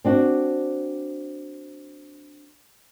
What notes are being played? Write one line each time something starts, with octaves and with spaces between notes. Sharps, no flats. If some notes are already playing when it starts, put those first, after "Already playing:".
C4 D4 F#4